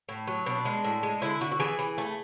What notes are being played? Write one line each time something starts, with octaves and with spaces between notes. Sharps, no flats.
A2
F#3
B2 D4
G#3
A2
G#3
D3 E4
D3 F#4
F#4
E3 G#4
E3
A3